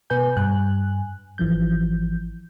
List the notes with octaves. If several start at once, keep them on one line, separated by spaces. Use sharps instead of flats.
B2 B4 G#5 G6
G2 G#5 F#6
G#1 E3 F3 G6